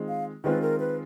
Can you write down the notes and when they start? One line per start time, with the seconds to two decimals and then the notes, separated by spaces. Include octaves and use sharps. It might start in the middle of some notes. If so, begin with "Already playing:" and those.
Already playing: D#3 G#3 C4 F4
0.08 F5
0.44 D#3 G#3 C4 F4 B4
0.62 A#4
0.80 B4